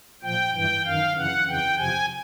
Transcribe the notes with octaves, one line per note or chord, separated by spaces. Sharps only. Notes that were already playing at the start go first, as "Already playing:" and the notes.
A#2 F3 G5
G2 E3 G5
F#2 D#3 F5
F#2 C#3 E3 F#5
F2 C#3 E3 G5
F2 C3 F3 G#5